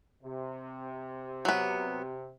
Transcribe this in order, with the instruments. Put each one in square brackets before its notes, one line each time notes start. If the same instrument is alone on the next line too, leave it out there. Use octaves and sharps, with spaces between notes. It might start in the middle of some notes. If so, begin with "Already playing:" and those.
[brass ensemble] C3
[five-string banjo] F#3 B3